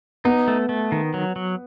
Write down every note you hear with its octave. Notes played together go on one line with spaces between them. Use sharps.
B3 D#4
A3
A3
D#3
F#3
F#3